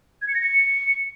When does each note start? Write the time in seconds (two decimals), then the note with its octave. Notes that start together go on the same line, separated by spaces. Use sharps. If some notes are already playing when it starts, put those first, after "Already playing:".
0.22 G#6
0.28 C#7
0.35 A#6
0.41 C#7